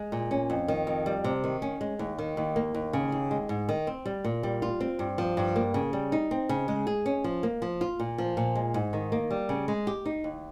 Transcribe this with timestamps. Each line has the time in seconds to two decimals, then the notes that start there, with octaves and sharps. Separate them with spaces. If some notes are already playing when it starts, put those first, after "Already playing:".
Already playing: G#3
0.12 A#2
0.31 C#4
0.50 F2
0.68 D#3
0.87 F2
1.06 G3
1.24 C3
1.44 D#3
1.62 C#4
1.81 G#3
1.99 D#2
2.18 D#3
2.37 D#2
2.56 A#3
2.75 D#2
2.93 C#3
3.12 D#2
3.31 G#3
3.49 G#2
3.69 D#3
3.87 C4
4.06 G3
4.24 A#2
4.43 G3
4.62 F4
4.80 C4
4.99 G2
5.18 F3
5.37 G2
5.56 A#3
5.74 C#3
5.93 G3
6.12 D#4
6.31 C4
6.49 C#3
6.68 G#3
6.87 G#4
7.06 C#4
7.24 F3
7.43 A#3
7.62 F3
7.81 F4
8.00 A#2
8.18 F3
8.37 A#2
8.55 G#3
8.74 G#2
8.93 D#3
9.12 A#3
9.31 G3
9.49 C#3
9.68 G#3
9.87 G4
10.05 D#4
10.24 D#2